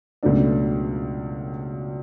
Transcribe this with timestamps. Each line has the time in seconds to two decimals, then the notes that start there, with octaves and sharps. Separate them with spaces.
0.23 C#2 B2 F#3 A3 D4